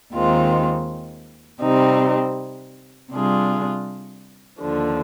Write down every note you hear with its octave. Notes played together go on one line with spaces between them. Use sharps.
D#2 D#3 G#3 C4 F4
C3 G3 C4 D#4
C3 G3 D4 F4 G#4
D#2 D3 F3